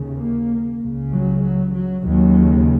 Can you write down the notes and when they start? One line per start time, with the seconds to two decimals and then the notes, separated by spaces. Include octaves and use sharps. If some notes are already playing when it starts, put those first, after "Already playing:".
Already playing: D#2 C#3
0.17 A#3
0.81 C#2 C#3
1.12 F#3
1.43 F#3
1.75 F#3
2.06 D#2 C#3 F#3